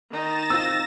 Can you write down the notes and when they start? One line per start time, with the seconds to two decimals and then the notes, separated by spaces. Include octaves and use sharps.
0.11 D#3 D#4 A6 A#6 E7
0.50 C4 F4 E6